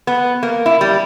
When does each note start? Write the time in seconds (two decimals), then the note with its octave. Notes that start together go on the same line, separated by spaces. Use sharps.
0.07 B3
0.43 A#3
0.66 E4
0.81 G3